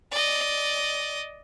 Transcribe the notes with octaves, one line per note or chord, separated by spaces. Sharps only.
D5 D#5